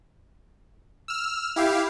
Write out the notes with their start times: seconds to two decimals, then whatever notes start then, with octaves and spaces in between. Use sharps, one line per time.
1.08 E6 F6
1.56 E4 G4 F5